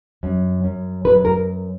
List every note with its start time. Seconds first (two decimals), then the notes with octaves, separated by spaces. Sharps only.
0.23 F#2
0.64 F#2
1.04 F#2 B4
1.25 A#4